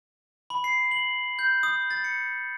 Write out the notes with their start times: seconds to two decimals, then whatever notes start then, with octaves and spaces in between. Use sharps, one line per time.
0.50 B5
0.64 C7
0.91 F#7
1.39 G6
1.63 D#6
1.90 A6
2.04 C#7